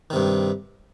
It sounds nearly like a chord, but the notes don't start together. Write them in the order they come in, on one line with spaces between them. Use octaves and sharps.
D#3 C3 G2